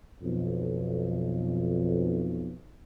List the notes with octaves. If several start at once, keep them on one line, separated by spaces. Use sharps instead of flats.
B1 F2